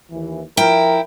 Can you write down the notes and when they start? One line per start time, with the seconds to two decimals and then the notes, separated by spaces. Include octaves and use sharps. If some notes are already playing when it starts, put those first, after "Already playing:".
0.11 D#2 E3
0.57 F3 E4 A#4 G5